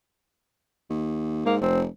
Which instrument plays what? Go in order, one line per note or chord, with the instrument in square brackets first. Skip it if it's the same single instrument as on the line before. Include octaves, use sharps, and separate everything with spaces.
[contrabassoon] D#2
[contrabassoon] G#2 [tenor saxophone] A#3
[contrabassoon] F1 [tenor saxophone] C4